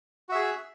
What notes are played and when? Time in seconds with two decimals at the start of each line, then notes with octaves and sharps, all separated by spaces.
0.29 F#4
0.32 E5
0.35 G#4